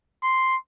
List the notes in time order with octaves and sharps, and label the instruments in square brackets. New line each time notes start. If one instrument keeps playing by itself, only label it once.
[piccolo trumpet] C6